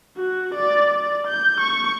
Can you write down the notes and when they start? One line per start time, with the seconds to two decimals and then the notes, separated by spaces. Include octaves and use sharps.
0.17 F#4
0.54 D5
0.90 D5
1.27 G6
1.60 C#6